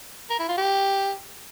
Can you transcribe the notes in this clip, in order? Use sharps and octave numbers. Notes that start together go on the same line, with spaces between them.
A#4
E4
F4
G4